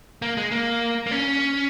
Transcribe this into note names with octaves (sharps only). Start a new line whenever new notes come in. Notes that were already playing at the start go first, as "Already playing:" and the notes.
A#3
G#3
A#3
A#3
C#4